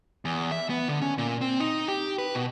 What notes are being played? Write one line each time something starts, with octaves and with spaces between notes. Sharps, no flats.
E2
E5
B3
D3
C#4
A#2
C4
D#4
G4
B4
B2